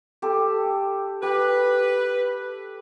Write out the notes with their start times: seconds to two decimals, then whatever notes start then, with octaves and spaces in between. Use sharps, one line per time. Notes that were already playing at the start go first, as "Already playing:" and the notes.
0.22 G4 A4 C6
1.23 G4 B4